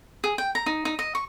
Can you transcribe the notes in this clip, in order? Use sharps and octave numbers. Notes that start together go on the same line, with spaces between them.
G#4
G5
A#5
D#4
D#4
D#5
C#6